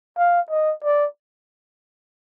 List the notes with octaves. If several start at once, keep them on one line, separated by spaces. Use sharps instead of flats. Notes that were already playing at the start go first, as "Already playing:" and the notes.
F5
D#5
D5